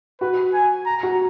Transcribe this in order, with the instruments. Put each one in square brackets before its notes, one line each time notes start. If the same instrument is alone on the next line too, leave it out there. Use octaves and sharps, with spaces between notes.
[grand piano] F#4 [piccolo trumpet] B4
[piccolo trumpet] G#5
A#5
[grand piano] F#4